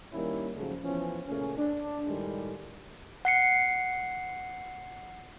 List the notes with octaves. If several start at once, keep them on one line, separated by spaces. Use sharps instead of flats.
D#3 G3 A#3 C#4 E4
G#2 C#3 F3 F#3 A3
E3 F3 B3 C#4
A#2 C#3 A3 C#4
D4
A2 D#3 G3 G#3
F#5 C7 C#7